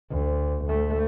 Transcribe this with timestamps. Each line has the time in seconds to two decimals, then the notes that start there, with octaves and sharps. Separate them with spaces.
0.11 D2
0.66 D2 A3